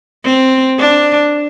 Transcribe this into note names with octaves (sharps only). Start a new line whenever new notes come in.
C4
D4